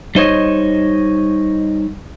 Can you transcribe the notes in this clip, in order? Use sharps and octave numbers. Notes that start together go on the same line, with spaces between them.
G3 D#4 C5 C#5 D#5